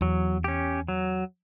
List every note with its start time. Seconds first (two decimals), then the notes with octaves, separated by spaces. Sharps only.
0.01 E2 F#3
0.44 C#4 G4
0.88 F#3